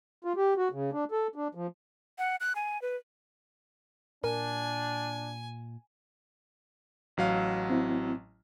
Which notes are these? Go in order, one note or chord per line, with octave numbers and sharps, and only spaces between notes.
F4
G4
F#4
C#3
D4
A4
D4
F3
F#5
F#6
G#5
B4
A#2 D4 A#4 G#5
A1 F#3 F5
C4 E4